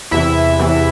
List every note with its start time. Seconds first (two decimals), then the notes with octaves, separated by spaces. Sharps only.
0.11 E2 C3 E3 E4 E5
0.59 E2 C3 E3